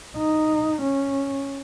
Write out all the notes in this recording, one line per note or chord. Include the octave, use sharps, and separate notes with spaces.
D#4
C#4